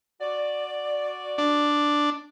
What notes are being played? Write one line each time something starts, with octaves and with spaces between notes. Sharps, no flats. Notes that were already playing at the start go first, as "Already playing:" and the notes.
F#4 D5
D4